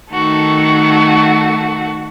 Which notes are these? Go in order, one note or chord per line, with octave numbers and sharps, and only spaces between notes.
D#3 A3 F#4 A4